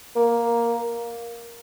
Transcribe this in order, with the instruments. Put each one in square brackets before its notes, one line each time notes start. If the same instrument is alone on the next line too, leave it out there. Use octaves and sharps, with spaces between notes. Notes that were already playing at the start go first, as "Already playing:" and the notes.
[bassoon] A#3